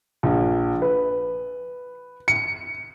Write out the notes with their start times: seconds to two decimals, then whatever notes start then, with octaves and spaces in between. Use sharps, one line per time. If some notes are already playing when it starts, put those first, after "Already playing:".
0.23 A#1
0.82 B4
2.28 C#7